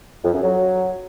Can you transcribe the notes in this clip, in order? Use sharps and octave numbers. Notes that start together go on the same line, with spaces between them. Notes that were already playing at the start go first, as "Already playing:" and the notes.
F2
F#2
F#3